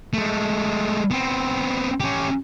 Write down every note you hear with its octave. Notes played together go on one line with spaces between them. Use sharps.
G#3 A3
B3 C4
C#4 G4